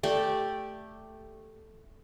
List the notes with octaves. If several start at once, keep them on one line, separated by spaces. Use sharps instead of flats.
A3 G4 D5